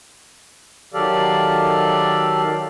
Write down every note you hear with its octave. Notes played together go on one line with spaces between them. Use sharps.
D#3 F#3 G4 A4 D5 F5